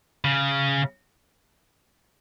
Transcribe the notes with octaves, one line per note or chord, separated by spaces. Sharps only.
C#3